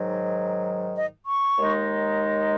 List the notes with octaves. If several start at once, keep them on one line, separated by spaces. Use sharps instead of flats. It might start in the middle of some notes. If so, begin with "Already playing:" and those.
Already playing: G#2 D#3 F#3
D#5
C#6
D#2 D#3 G#3 D#4